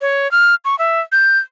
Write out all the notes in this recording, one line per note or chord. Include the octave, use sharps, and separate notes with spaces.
C#5
F6
C#6
E5
G6